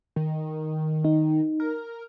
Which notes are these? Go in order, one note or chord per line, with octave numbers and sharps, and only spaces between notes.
D#3
D#4
A#4